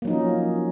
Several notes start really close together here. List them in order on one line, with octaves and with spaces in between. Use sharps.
A#3 F#3 D#4 F3 C#4